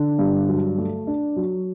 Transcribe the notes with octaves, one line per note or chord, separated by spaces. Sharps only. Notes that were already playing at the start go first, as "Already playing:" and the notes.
Already playing: D3
G2
F#3
A3
D4
F#3